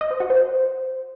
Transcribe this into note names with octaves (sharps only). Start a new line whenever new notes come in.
D#5
C5
F#4
C5